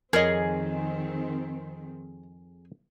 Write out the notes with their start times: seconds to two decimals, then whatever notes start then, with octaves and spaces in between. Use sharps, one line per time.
0.13 F2 D#3 C4 G#4 A#4 C#5 D#5